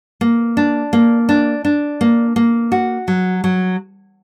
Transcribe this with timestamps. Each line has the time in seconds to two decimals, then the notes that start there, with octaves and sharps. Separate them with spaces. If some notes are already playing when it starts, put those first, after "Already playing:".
0.21 A#3
0.57 D4
0.93 A#3
1.29 D4
1.65 D4
2.01 A#3
2.36 A#3
2.72 F#4
3.08 F#3
3.44 F#3